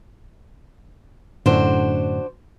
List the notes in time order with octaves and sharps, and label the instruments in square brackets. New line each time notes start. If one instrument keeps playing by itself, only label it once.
[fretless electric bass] F#2 A2 D3 [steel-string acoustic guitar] D4 F#4 C5